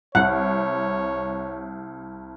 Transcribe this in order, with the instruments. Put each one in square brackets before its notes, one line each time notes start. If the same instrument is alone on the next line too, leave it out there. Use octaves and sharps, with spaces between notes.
[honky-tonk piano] C2 [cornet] C#5 [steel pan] F#5